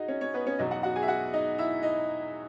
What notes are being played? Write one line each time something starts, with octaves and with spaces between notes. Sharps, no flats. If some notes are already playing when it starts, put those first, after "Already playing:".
Already playing: D#4 F#4 G#4 D#5
C#4 C#5
C#4 C#5
B3 B4
C#4 C#5
E2 B2 F#3 D#4 D#5
F#4 F#5
F#4 F#5
G#4 G#5
E5
F#4 F#5
D#4 D#5
E4 E5
D#4 D#5